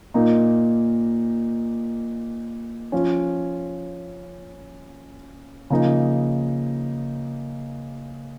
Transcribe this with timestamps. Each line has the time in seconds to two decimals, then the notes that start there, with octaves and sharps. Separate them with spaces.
0.14 A#2 A#3 D#4
2.92 F3 C#4
5.70 C#3 F3 A#3 D#4